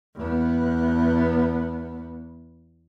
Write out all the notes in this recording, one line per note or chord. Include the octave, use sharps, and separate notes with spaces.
E2 B3